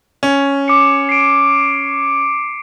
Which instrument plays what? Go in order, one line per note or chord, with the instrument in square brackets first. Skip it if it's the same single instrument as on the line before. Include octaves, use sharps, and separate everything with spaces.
[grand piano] C#4
[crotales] D6 C#7
C7 D7